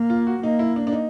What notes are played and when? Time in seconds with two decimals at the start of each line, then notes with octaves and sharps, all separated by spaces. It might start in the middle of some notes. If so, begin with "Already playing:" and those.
Already playing: A#3
0.10 F4
0.27 F#4
0.43 A#3 D#4
0.59 E4
0.76 D4
0.87 D4
0.93 D#4